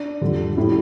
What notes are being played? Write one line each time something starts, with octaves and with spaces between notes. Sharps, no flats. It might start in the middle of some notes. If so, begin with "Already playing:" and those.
Already playing: D4
F2 D3 G3
A2 G3 E4